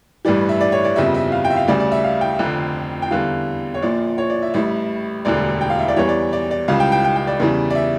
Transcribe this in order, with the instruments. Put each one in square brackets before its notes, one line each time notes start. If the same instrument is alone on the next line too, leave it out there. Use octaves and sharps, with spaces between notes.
[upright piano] A1 G2 E3 G3 D5
E5
D5
C#5
D5
G1 F2 C#3 G3 E5
E5
F5
G5
E5
F5
D2 C#3 G3 D5
D5
E5
F5
G5
F1 F2 D3
G5
E2 D3 G3 F5
C#5
A#1 A#2 F3 D5
C#5
D5
E5
A1 A2 G3 E5
E1 D2 D3 G3 D5
G5
F5
E5
D5
E2 E3 G3 C#5
D5
D5
D5
C#2 C#3 G3 F5
G5
G5
G5
G5
D5
E2 C#3 E3 G3
D5
E5